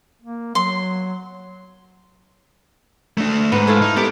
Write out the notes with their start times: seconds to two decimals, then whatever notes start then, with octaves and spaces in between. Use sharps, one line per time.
0.22 A#3
0.55 F#3 C6
3.18 A3 D4
3.52 G#2 B3
3.67 A3 E4 F4
3.81 D#4
3.96 B3 G4 A#4 D5